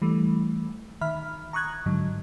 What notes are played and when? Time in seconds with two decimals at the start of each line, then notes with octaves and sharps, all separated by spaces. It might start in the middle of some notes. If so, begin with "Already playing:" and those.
0.02 E3 G3 A3
1.01 D#3 E5 B5 F6
1.53 A#5 C#6 D#6 F#6 G#6
1.86 G#2 D3 F#3